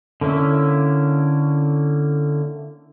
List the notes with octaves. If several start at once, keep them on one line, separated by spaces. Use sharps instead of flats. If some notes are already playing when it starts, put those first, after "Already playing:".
D3 A#3 C#4 E4